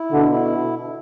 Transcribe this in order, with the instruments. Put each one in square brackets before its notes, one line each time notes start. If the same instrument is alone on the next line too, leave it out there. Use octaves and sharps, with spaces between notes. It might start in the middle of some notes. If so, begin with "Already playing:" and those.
Already playing: [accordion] E4
[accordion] B2 [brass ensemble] D3
[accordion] E4